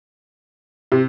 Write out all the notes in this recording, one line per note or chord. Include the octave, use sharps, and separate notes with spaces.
C3